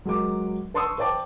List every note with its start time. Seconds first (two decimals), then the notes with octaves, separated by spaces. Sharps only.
0.05 F#3 G#3 A#4 D6
0.74 B4 A5 C6 C#6 D#6 E6
0.98 B4 C5 D5 G5 A5 D6